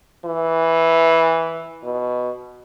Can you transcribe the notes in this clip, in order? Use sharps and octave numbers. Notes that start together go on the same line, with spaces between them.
E3
B2